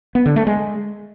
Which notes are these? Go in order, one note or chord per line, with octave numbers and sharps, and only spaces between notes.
B3
D3
A3
G#3